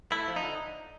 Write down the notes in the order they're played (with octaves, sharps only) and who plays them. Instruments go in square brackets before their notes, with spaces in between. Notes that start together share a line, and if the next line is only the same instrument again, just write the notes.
[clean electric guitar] A3 E4
F3
D#4
D3